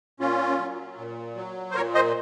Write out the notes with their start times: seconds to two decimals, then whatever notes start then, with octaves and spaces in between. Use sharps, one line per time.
0.20 A#2 C#4 F4
0.59 F#3
0.98 A#2
1.36 F#3
1.71 C5
1.75 A#2 A#4 C#5
1.95 C5 D#5